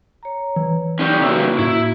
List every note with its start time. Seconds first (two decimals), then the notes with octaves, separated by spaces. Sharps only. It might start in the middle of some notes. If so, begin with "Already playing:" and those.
0.23 C#5 A#5
0.56 E3
0.99 C#4 D#4 E4 G4 C#5 D5
1.20 C#3 E3 A#3 E4 F#4 A#5
1.41 C#6
1.59 A2 E4